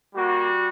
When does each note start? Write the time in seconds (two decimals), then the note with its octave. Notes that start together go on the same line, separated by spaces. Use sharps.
0.14 G3 A#3 F#4